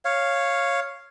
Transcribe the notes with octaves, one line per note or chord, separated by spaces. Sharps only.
C#5 F5